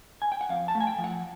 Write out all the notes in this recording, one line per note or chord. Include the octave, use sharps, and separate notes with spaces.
G#5
G5
F#5
F2 F5
A5
A3
G#5
G5
F3
F#5